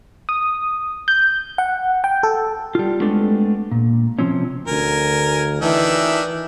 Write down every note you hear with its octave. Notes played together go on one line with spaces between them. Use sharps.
D#6
G6
F#5
G5
A4
G3 F4
G#3 A3 B3 C4 D4 A4
A#2
C3 F3 C4 C#4
D2 A#4 G#5
D#3 E3 D4 E5